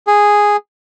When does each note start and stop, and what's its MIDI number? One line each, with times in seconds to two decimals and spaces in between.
0.07 0.57 68